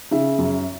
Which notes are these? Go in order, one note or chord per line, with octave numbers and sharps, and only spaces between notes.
C#3 E5
F#2